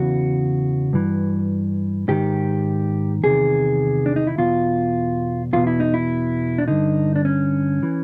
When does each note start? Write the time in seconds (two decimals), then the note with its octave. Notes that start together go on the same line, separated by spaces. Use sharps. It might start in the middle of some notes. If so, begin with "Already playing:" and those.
Already playing: E2 C#3 E3 F#4
0.93 G2 E3
2.08 G#2 D#3 G4
3.23 E2 C3 D#3 G#4
4.06 D4
4.16 D#4
4.27 E4
4.38 E2 B2 F4
5.53 E2 B2 F4
5.67 E4
5.80 D#4
5.94 E4
6.58 D4
6.68 G2 D3 D#4
7.16 D4
7.25 C#4
7.83 E3